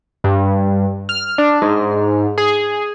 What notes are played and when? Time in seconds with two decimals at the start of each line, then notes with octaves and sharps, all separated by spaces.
0.24 G2
1.09 F6
1.38 D4
1.62 G#2
2.38 G#4